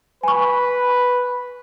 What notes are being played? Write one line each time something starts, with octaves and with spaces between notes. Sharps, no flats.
B4 G#5 C#6